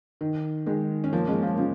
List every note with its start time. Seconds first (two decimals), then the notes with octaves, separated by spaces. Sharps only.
0.21 D#3
0.66 D#3 G#3
1.04 C#4
1.13 F3 A#3
1.27 G#3 C#4
1.43 F3 A#3
1.58 C#3 F3